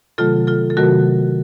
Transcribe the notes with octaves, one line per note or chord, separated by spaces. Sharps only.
C3 D#3 F#3 A3 F4 A4
F4 A4
A4
C3 D#3 F#3 A3 F#4 A#4